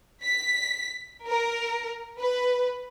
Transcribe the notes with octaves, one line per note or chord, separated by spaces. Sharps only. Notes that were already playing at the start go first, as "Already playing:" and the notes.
B6
A#4
B4